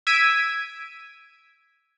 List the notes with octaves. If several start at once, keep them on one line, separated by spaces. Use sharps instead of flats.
E6 G#6 B6 D7 D#7